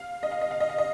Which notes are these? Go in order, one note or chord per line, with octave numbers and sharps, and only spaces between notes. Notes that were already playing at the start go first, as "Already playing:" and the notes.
Already playing: F5
D#5
F5
D#5
F5
D#5
F5
D#5